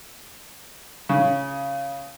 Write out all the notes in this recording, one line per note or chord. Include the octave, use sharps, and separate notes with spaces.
C#3